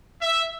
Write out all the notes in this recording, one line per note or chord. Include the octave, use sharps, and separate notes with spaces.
E5